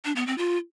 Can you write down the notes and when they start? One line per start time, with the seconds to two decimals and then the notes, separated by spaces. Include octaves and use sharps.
0.05 D4
0.16 B3
0.27 C4
0.38 F4